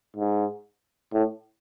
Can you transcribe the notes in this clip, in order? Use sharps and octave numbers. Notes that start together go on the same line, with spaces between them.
G#2
A2